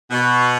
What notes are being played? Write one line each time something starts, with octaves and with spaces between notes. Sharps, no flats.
B2